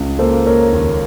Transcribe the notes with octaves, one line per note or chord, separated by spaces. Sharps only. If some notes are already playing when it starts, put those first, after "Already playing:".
Already playing: C#2
A#3 A4 C5
A#3 A#4 C#5
D#2